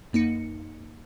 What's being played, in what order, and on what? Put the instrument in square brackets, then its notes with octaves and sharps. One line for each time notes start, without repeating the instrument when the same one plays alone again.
[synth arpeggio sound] F#2 A#3 D#4 C#7